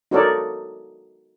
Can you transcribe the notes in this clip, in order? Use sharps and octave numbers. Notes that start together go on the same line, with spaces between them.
D#4 F#4 A4 A#4 C#5 D5